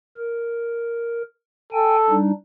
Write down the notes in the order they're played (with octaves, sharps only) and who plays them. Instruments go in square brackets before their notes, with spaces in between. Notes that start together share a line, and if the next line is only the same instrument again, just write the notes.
[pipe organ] A#4
[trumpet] A4 [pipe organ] G5 G#5
[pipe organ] G3 D4 D#4